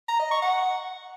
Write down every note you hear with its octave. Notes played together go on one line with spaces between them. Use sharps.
A#5
D#5
C#6
F#5